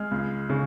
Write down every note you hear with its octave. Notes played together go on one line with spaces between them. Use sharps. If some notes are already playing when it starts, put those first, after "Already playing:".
Already playing: G#3 F6
C#2
C#3